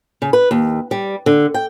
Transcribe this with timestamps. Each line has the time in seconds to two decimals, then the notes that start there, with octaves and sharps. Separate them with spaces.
0.22 C#3
0.33 B4
0.51 D#2
0.91 G3
1.26 D3
1.54 G5